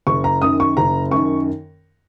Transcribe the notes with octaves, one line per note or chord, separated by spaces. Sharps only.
F#1 C#6
A#5
F#2 D#3 D#6
C#6
F#1 A#5
F#2 D#3 C#6